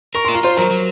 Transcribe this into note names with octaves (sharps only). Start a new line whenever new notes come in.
A#4 C#6
F4 C6
A#5
F4 C5 C6
F#3 A#4 A#5
F#3